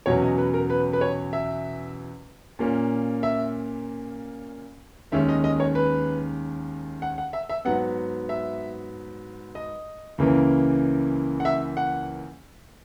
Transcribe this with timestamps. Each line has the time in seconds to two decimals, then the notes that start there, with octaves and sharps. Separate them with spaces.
0.06 E2 B2 F#3 C#4 C#5
0.22 D#5
0.38 B4
0.54 A#4
0.70 B4
0.93 B4
1.01 C#5
1.33 E5
2.59 A#2 A#3 C#4
3.23 E5
5.12 D#2 D#3 G#3 C#4 E5
5.29 D#5
5.44 D#5
5.60 C#5
5.75 B4
7.02 F#5
7.18 F#5
7.33 E5
7.49 E5
7.65 G#2 F#3 B3 F#5
8.29 E5
9.55 D#5
10.18 C#2 C#3 E3 A#3 C#4
11.40 F#5
11.45 E5
11.77 F#5